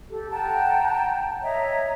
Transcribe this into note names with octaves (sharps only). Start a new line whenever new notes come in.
G4 A4
F#5 G5 A5 A#5
C#5 D#5 E5 A#5